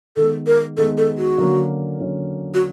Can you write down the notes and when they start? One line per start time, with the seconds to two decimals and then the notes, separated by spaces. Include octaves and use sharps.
0.16 D#3 G#3 B3 D#4 A4
0.47 A#4
0.77 D#3 G#3 B3 D#4 A4
0.98 A4
1.17 F#4
1.38 D3 F#3 A#3 C#4
1.99 D3 F#3 A#3 C#4
2.54 F#4